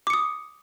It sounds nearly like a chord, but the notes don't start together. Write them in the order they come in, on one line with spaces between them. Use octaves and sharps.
D6 C#7 D#6